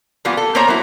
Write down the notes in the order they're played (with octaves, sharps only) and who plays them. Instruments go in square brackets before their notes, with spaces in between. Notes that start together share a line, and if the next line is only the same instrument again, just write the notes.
[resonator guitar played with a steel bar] E3 G3 A#3 B3 F4
A4
A#3 B3 A#4 C5 C#5 A#5
F#3 E4